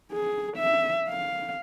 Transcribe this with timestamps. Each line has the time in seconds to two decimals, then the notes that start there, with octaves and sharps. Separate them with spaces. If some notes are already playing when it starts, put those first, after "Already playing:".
0.12 G#4
0.57 E5
1.08 F5